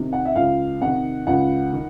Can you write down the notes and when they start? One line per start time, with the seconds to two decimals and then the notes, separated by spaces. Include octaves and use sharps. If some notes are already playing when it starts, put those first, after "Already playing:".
Already playing: C3 D#3
0.13 F#5
0.25 E5
0.36 C#2 F5
0.81 C3 D#3 F#5
1.27 C#2 F#5
1.73 D#3